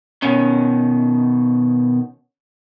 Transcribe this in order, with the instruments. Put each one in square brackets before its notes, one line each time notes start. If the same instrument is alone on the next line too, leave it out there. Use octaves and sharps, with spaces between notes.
[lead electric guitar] B2 D#3 [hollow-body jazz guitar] C#4